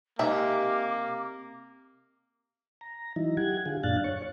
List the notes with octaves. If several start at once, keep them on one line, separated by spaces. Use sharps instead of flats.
C3 G#3 A#3 D#4 E5 D6
A#5
E3 F#3 D#4 E4
G4 F#5 G#6
D3 F4 G#4
F#2 A#2 D4 F5 F#6 A6
C#5 C#6